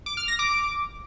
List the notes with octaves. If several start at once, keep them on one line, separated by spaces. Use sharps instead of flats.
D6
F6
A#6
D6